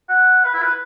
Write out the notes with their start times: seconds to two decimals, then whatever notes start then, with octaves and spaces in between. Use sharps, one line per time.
0.09 F#5
0.45 B4
0.54 E4
0.62 B4